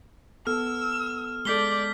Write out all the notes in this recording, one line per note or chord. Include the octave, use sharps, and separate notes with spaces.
B3 A4 E6 F6
G#3 A4 D5 G6 B6 G7